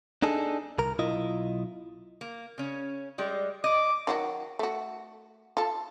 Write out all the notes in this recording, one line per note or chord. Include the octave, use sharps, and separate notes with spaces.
D4 D#4 G#4 A4
C2 A#4
B1 E4 F4 D#5
A#3
C#3 C#4
G3 G#3
D#5 D6
D#3 F#3 F#4
A3 F#4
F4 A4